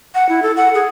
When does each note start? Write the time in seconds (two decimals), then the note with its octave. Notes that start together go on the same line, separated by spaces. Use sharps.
0.15 F#5
0.29 E4
0.42 A4
0.57 F#5
0.74 G#4